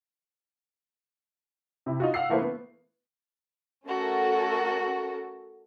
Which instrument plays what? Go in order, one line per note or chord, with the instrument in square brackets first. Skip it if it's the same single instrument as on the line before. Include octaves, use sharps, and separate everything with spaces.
[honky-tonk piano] C3 E4
D#4 F4 F#4
F5 F#5 E6 C7
E3 A3 A#3 E4 B4 C5
B3
[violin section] A3 C#4 F#4 A4 A#4